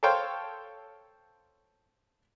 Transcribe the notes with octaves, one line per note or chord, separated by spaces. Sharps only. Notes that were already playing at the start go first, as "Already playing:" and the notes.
A4 C5 C#5 F5 G5 C6